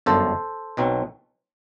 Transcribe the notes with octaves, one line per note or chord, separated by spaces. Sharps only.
G1 F#2 D3 A4 C5
B1 B2 F#3 C4